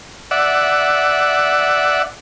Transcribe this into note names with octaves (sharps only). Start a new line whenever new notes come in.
D5 E5 F#5